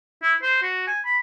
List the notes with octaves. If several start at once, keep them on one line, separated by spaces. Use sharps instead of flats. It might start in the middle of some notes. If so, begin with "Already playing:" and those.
E4
C5
F#4
G#5
B5